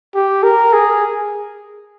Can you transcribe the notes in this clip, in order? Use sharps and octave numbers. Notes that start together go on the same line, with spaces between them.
G4
A#4
G#4